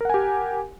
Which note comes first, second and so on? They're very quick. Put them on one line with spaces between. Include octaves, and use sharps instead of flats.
A#4 F#5 G#5 G4